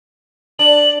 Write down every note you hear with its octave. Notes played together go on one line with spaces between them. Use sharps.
D4 F#7